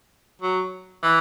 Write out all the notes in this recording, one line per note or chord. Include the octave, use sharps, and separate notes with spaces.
F#3
E3